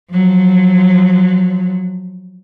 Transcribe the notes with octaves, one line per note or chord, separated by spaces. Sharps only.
F3 F#3